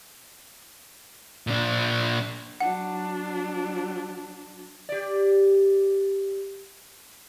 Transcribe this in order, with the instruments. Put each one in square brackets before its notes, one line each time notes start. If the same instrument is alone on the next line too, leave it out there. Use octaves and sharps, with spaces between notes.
[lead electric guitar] A#2 D4
[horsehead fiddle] F#3 D4 [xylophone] F#5
[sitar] G4 D5